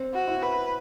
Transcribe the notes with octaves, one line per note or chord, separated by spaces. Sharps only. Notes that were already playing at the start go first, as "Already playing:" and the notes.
Already playing: C4
F#4
E4
B4